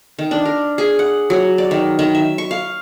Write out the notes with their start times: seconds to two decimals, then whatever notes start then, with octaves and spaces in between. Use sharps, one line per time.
0.19 D#3
0.31 D4
0.45 A#4
0.78 G#4
0.99 F#5
1.30 F#3
1.58 D5
1.71 D#3
1.99 D#3
2.15 E5
2.38 C#6
2.51 F5